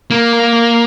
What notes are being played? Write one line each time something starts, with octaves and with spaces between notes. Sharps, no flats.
A#3